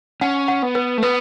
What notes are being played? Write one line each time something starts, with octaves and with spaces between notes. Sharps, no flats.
C#4 F#5
F#5
B3
B4
A3
B3 B4